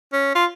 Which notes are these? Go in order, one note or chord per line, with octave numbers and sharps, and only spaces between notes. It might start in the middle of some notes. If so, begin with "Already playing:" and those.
C#4
F4